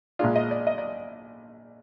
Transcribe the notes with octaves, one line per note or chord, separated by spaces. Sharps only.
A#1 A#2 G#3 D4 F4
D#5
D5
D#5
D5